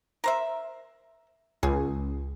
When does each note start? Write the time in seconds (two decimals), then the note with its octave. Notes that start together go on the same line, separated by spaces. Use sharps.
0.24 A#4 C5 E5
1.63 C#2 G#4